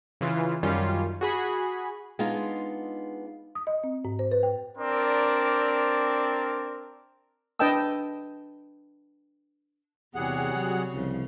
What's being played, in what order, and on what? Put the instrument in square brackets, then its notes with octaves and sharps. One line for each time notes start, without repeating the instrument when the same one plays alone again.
[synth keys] C#3 E3 F4
F#2 D#3 G3 C#4 F4
F#4 G#4 B5
[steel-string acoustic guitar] G#3 B3 D4 D#4 F4
[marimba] D#6
D#5
C4
G#2
C5
B4
G5
[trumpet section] C4 D4 A#4 D5
[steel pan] D4 B4 D#5 G5 A5 E6
[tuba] E2 [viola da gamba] C3 F#4 C#5 [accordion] G3 G#4 F#5
[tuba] F#3
[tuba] C2 [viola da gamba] C#3 F3